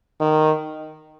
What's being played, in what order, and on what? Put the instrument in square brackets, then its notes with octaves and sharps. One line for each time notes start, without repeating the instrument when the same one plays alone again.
[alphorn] D#3